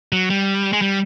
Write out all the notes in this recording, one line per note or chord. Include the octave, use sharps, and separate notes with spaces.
F#3
G3
G#3
G3